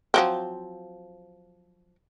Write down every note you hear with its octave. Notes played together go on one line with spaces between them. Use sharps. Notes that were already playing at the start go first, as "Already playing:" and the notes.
F3 F#3 C4